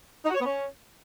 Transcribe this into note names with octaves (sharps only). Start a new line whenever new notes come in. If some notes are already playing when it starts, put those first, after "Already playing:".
D#4
F#4
C#5
B3
C#4